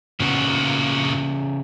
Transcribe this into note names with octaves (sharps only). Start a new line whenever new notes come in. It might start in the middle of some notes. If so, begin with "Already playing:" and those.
A#2 C#3 B3 F#4